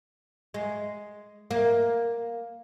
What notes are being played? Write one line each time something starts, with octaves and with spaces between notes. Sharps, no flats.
G#3
A#3